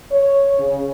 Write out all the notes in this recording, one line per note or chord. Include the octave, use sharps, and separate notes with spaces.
C#5
C#3